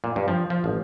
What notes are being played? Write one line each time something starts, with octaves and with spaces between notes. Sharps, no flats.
A#2
G2
F3
F3
A1